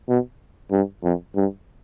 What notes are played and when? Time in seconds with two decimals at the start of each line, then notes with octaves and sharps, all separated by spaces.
0.09 B2
0.71 G2
1.03 F2
1.36 G2